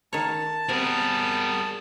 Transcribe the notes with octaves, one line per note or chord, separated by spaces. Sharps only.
D#3 C#5 A5
C3 G3 B3 G#4 A#4